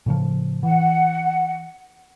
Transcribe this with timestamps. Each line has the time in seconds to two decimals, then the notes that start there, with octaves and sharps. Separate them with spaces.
0.06 A2 C#3 F3
0.63 E3 F#5